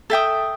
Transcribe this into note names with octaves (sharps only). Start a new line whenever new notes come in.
A4 E5 G5 D#6